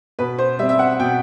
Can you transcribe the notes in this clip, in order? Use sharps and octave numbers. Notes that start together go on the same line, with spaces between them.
B2 B4
C5
G3 C4 E5
E5
F#5
B2 G5